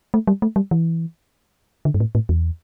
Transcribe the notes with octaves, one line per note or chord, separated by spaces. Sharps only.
A3
G3
A3
G3
E3
D3
G2
A2
A2
E2